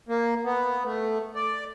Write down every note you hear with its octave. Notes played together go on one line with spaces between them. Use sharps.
A#3
B3
A3
D5